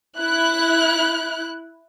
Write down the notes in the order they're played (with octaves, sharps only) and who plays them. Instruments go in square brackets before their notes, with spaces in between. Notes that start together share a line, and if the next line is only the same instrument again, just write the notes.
[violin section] E4 F#6